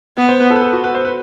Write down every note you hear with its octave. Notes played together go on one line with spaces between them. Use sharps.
B3 B4
C5
B4
A4
B4
A4
F#4
B4
C5
B4